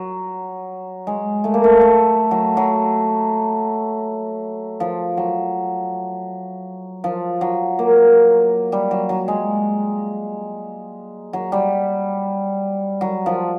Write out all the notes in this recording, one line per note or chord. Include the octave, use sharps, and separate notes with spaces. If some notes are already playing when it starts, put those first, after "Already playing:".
Already playing: F#3
G#3
A3
A#3
A3
A3
F#3
F#3
F3
F#3
F3
F#3
A#3
G3
F#3
F#3
G#3
F#3
G3
F#3
F3